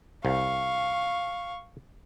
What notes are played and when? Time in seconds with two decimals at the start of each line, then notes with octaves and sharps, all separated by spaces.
0.25 C2 F5 C#6